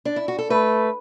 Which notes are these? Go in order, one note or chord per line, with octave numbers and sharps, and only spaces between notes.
D4
E4
F#4
A4
A3 B4